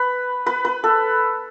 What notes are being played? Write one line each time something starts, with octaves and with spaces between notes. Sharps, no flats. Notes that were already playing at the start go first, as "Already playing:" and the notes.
Already playing: B4
B4
B4
A4